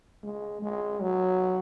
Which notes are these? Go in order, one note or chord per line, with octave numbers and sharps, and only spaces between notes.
G#3
G#3
F#3